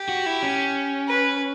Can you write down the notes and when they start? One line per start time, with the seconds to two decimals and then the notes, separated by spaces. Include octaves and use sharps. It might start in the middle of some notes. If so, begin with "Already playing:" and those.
Already playing: G4
0.09 F#4
0.26 E4
0.42 C#4
1.08 B4